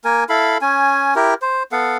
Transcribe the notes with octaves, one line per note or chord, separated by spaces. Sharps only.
A#3 A#4 G#5
E4 A4 F5 B5
C#4 G#5
E4 G4 A#4
C5
B3 A4 F5 F#5